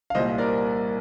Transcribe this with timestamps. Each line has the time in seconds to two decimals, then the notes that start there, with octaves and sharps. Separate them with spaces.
0.10 F5
0.15 C2 A#2 G3 C5 D#5
0.38 A#4 D5